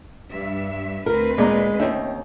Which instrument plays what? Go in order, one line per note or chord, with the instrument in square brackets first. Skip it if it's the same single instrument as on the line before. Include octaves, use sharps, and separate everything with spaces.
[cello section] G2 E5
[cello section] D2 C4 B4 [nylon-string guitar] A#4
[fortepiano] A#2 D5 A#5 [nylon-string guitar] G#3
[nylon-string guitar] D#2 C4 C#4 [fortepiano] D#4 E5